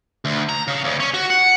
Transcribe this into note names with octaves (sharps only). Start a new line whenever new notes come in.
D2
A#5
C#3
D2
C#4
F#4
F#5